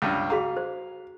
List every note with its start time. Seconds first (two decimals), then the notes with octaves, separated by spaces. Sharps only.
0.02 C#2 G2
0.30 F#4 G#4 F5 A#5
0.57 C5